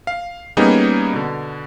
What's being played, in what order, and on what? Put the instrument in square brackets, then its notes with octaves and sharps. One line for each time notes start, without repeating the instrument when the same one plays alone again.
[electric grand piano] F5
G3 A#3 B3 C#4 D#4 G#4
B2 D3